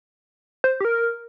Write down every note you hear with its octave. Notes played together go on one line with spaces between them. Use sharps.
C5
G4
A#4